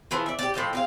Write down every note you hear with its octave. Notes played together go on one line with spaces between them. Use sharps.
E3 F3 G#4
D5 E5
G4 D5
A2 F3 D#5 G5
C4 G#4 F5